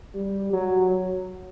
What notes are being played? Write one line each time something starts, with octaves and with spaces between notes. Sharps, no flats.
G3
F#3